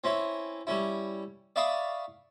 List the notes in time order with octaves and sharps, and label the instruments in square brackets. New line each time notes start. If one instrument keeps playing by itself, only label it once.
[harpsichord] C4 C#4 E4
G3 C#4 E4
D5 E5 F5 B5 C#6 D#6